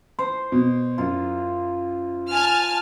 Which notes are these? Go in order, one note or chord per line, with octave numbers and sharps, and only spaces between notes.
C5
B2
F#2 F4
G#5 A5 F6